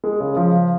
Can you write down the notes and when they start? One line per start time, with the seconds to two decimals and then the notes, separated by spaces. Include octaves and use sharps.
0.04 G#3
0.20 C#3
0.37 F3